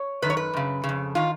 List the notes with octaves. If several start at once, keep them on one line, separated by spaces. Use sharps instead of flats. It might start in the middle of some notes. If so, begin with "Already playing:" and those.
Already playing: C#5
F#2 D#3 B4
C#5
B4
F#2 C#3
C#3
F2
D#3 F4